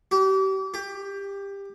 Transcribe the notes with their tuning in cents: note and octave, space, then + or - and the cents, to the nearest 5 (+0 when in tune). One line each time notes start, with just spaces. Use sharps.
G4 -35
G4 +20